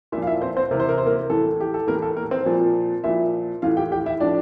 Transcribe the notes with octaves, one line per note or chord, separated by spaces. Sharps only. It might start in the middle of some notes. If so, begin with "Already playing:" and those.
A#2 F3 E4 E5
F5
E4 E5
C4 C5
C4 C5
C3 E3 A#4
C5
A#4
C5
A#3 A#4
A2 E3 A4
G4
A4
A2 E3 A#3 A#4
A4
A#3 A#4
C4 C5
A#2 F3
A#2 F3 E4 E5
A2 E3 F4 F5
G4 G5
G4 G5
E4 E5
A2 F3 D4 D5